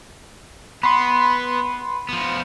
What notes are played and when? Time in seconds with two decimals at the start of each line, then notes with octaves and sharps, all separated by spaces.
0.83 B3 B5 C6
2.09 F3 B3